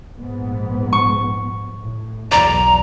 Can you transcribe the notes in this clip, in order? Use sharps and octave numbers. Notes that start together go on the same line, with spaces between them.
A#1 G#2 B3
C#6
A2
B1 E2 F#3 D5 A#5